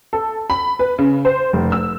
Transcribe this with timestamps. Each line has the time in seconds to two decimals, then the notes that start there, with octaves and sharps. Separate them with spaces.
0.13 A4
0.50 B5
0.79 B4
0.99 C#3
1.25 C5
1.53 F1
1.72 E6